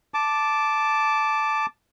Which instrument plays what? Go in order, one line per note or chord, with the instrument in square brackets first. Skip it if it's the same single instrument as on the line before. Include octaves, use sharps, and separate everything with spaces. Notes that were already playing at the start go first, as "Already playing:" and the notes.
[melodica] A5 D6